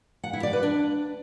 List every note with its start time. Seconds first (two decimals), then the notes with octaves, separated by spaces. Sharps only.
0.24 F#5
0.33 E4
0.43 D5
0.53 B4
0.63 D4